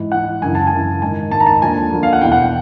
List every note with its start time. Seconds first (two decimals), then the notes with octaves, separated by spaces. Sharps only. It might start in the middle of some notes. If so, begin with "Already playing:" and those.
Already playing: G#2 E3
0.12 G#2 E3 F#5
0.42 F#2 C#3 E3 G#5
0.55 A5
0.67 G#5
0.72 F#2 C#3 E3
1.02 G#2 D#3 G#5
1.31 G#2 D#3 A5
1.40 A#5
1.47 A5
1.62 D#2 D3 F3 G#5
1.92 D#2 D3 F3
2.03 F5
2.13 F#5
2.22 E2 B2 G5
2.32 F#5
2.42 G5